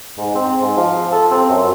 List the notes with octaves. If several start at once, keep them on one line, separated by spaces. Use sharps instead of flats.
G#2
C4
G#2
F3
A4
C4
F#2